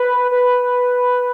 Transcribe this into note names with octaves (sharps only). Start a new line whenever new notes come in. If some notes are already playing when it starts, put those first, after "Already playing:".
Already playing: B4
B4